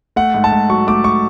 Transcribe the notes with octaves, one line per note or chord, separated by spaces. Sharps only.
A3 F#5
G#2
A5
G#2
F#3 C#6
A3 D6
C#6